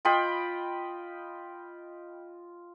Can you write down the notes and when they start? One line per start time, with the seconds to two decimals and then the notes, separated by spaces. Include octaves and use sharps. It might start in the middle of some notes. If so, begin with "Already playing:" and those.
0.05 F4 D#5 G5 B5